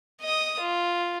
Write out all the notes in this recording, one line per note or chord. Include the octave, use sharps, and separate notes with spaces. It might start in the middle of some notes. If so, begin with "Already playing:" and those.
D#5 D#6
F4